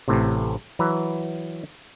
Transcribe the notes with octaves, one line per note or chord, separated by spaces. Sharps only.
A1 A2 C3
E3 F#3 B4 A#5